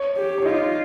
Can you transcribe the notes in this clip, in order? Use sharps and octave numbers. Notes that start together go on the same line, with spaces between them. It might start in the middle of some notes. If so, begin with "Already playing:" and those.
Already playing: C#5
G4
C#5
D#4 F4 D#5